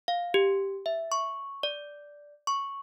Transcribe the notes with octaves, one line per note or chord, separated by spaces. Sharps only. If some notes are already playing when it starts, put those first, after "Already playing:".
F5
G4
E5
C#6
D5
C#6